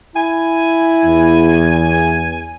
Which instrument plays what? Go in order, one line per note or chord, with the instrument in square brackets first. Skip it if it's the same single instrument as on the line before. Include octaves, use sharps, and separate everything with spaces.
[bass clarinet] E4 [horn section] G#5
[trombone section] E2